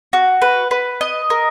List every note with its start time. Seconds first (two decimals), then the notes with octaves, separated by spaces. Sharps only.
0.13 F#4
0.42 B4
0.71 B4
1.01 D#5
1.30 A#4